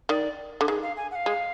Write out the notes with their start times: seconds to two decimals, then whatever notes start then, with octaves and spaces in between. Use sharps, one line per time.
0.09 D#3 D5
0.61 D3
0.68 D#3 G#4
0.82 F5
0.97 G#5
1.11 F#5
1.15 F5
1.26 G#3